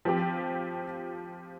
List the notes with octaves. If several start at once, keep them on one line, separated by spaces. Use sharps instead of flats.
F3 C4 G4